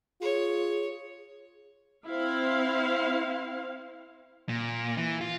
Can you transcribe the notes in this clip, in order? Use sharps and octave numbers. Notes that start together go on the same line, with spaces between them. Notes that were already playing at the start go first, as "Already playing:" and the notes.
F4 G#4 C#5
C4 E4 F5
A#2
E3
F4